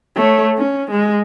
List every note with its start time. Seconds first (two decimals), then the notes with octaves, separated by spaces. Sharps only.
0.16 A3 C#5
0.58 C#4
0.91 G#3